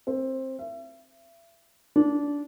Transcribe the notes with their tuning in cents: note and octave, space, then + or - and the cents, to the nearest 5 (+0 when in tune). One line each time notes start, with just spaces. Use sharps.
C4 +15
E5 +35
D4 -20